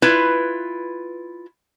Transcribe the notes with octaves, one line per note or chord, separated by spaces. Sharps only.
E4 F4 B4